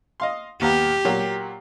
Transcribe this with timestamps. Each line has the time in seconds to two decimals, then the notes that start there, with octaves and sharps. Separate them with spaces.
0.20 D#5 F5 C6
0.61 D#2 B3 G4 A#5
1.05 A#2 F#3 A#3